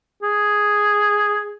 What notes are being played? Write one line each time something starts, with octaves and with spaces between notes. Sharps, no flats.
G#4